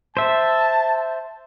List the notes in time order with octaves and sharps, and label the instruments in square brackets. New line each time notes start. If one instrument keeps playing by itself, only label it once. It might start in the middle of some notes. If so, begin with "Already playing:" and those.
[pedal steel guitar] C5 E5 [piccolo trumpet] A5